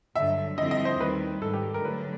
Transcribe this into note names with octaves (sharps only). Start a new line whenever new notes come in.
G2 D3 F#3 E5
F2 D3 G3 C4 E4 D#5
D#5
C5
D#2 D#3 G3 B4
G#2 D#3 G3 A4
G4
A#4
D3 F#3 A3 D4 B4